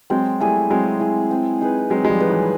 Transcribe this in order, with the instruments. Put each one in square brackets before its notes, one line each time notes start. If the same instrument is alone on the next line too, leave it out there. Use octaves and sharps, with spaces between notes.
[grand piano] F#3 G#3 [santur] C4
[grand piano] G3 A3 [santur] E4 G#4
[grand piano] F#3 G#3 [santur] C4
[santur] E4 G#4
C4
D#4 G#4 B4
[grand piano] F#3 G#3 [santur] C4
[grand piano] G#3
F3 G3
[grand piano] F3 [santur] D#4 G#4 B4
[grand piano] E3 F#3